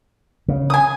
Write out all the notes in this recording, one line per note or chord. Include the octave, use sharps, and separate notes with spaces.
C#3
G#5 D#6